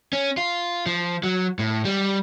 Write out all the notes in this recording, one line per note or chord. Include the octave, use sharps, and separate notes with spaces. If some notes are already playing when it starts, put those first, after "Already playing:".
C#4
F4
F3
F#3
A2
G3